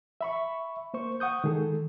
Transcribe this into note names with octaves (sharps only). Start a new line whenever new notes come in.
E5 B5 C#6
A#3 C5 C#6
F#5 C#6 D#6 G6
D#3 G#3 G#4 A4